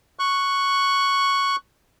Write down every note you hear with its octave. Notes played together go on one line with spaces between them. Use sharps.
C#6 F#6